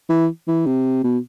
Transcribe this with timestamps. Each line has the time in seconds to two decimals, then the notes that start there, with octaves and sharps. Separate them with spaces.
0.09 E3
0.48 E3
0.66 C3
1.04 B2